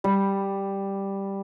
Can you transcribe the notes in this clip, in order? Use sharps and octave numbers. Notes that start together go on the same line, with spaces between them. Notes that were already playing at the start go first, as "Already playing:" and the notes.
G3